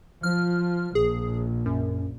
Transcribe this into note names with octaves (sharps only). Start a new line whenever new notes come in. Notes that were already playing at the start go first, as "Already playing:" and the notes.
F3 F6
A#1 G#4
F#2